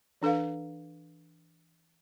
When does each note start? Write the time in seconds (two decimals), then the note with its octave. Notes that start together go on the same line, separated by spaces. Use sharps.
0.22 E3 D4 A4 B4 F5